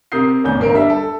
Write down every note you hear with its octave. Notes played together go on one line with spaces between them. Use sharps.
C3 A#4 D#6 G6 C7
A1 E2 C#4 G6
G1 A#3 A#4 D7
G3 D4 E5
A4